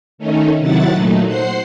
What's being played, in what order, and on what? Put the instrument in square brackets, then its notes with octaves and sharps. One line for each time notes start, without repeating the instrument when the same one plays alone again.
[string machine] D#3 A3 C#4 D#4
C3 D#3 F#3 E4 F#5 A6
A#2 F#3 A3 D#4
C5 F#5 C7